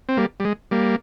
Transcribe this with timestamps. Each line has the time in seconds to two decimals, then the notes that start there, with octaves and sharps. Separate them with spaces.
0.09 C4
0.17 G3 A#3
0.40 G3
0.45 G#3
0.71 G3 A#3